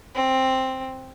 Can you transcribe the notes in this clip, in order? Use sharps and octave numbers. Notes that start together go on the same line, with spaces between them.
C4